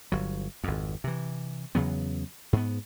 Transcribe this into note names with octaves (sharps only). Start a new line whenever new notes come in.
G1 F#3
G#1 F2
C3 E3
E2 C#3 F#3 B3
G#2 B3